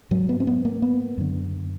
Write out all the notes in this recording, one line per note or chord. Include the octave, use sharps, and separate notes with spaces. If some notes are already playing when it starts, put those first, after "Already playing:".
G#2 F#3
B3
C4
B3
A#3
B3
F#2 D3